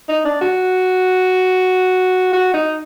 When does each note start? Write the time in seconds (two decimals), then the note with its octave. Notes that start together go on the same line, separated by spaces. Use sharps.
0.09 D#4
0.25 D4
0.41 F#4
2.33 F#4
2.54 D#4